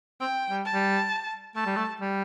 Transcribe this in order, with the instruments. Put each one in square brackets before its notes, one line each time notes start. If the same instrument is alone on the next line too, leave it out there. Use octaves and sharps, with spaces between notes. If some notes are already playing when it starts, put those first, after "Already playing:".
[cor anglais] C4 [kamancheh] G5
[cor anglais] G3
[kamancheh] A5
[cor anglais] G3
[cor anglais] A3 [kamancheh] A5
[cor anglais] G3
A3
G3